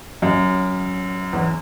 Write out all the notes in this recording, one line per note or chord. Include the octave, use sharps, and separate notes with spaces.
F#2
E2